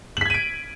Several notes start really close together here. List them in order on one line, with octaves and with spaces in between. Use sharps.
F#7 B6 G#6 D#7 D7